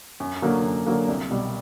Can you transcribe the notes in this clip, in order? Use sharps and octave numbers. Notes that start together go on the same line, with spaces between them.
F#2
D3 F#3 A#3
F#2
D3 F#3 A#3
C2
B2 G3